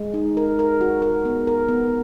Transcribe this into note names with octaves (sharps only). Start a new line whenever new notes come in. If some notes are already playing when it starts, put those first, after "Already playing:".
Already playing: G#3
D#4
A#4
A#4
F#4
A#4
B3
A#4
B3